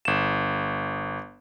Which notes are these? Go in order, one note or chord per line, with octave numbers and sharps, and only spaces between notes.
G1 E7